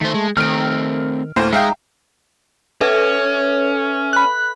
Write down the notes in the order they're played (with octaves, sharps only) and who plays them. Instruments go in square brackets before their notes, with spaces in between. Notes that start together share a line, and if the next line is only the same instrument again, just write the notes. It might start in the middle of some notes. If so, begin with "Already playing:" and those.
[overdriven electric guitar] D#3 C5 [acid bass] A3
[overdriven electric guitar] G#3
[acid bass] D#3 [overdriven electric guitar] A3 C4 [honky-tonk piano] F6 D7
[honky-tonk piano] D2 A2 C5 [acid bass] A#3
[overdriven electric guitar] G#3 [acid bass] D#4 [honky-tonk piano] E5 F5 G5
[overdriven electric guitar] C#4 [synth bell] A4 B4 E5
[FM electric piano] B5 F#6